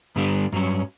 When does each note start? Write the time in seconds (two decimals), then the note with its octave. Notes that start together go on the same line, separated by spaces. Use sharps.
0.16 G2 D3 G3 B3 D4
0.53 G2 F#3 C#4